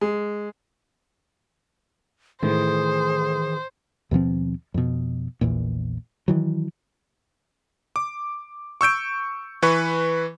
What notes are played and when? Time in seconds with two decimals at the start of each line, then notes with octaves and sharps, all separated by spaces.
0.01 G#3
2.43 A2 D#3 E3 G#4 C5
4.11 D#2 B2 F3 C4
4.74 F2 B2
5.41 A#1 E2 A#2
6.28 D#3 E3 F#3
7.96 D6
8.81 C#6 E6 G6 D7
9.62 E3 B4 C#6